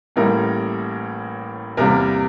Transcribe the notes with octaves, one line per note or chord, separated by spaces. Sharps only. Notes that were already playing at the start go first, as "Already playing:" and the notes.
A1 A2 G3 A#3 A#4
E2 C3 G3 A#3 A#4